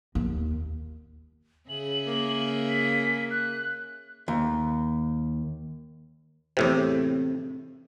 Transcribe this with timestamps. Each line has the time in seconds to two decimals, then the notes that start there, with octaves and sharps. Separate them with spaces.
0.15 D#2
1.69 C#3 G#4 E5 F#7
2.05 A#3
2.68 B6
3.31 F#6
4.28 D#2
6.57 E2 A2 C3 C4